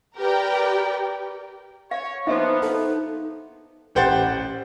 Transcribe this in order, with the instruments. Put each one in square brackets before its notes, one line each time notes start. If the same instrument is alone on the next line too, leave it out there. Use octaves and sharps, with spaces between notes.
[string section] G4 A#4 B4 D5 G5
[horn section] C#5 [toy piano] F5
[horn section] F3 A#3 B3 [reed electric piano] D#4 C5 [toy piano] E5
[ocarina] D#4 [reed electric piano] A4
[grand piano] A1 G4 C5 F#5 A6